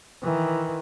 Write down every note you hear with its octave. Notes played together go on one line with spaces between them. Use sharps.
D#3 E3